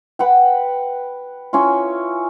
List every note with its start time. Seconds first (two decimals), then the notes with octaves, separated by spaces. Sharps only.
0.19 B4 F#5 G5
1.53 C#4 E4 F4